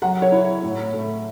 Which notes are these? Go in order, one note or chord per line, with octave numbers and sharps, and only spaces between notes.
F#3 F#5
C#5
E4
A2
A3